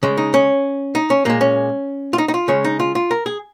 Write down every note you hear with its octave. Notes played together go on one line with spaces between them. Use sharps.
C#3 G#3
D#4
C#4
D#4
C#4
A#2 G#3 A#3
C#4
F4
D#4
D#4
F4
C#3 G#3 C#4
D#4
F4
F4
A#4
G#4